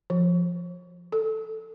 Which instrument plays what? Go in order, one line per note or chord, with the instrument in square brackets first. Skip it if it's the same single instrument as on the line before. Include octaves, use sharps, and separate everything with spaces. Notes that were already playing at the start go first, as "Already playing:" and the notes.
[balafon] F3
A4